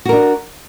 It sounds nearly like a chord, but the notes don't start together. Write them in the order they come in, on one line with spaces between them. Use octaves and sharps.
F#4 A#4 D4